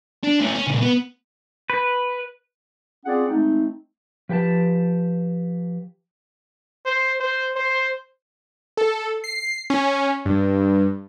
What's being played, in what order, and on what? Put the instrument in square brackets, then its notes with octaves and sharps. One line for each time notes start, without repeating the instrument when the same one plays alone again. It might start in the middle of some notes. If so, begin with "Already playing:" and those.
[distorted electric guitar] D4
A3 C#4
C#4
A#2 C#3
B3
[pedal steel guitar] B4
[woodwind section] C4 C#4 F4 G#4 D5 F#5
G#3 A3 C4 D#4
[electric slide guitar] F3 G4 B4 G5 A5
[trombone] C5
C5
C5
[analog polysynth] A4
C7
C#4
G2